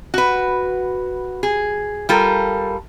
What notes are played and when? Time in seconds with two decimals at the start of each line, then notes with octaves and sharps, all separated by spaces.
0.14 F#4 B4
1.43 G#4
2.09 G3 F4 A4 A#4